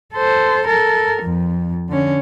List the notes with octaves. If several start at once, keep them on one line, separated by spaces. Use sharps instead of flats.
A4 C5
A4 A#4
F2
D3 C#4